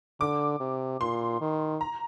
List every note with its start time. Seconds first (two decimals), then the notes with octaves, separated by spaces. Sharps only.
0.20 D3 D6
0.60 C3
1.00 A#2 C6
1.41 D#3
1.81 A#5